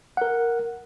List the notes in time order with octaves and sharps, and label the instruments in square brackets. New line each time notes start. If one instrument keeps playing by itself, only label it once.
[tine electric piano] A#4 F#5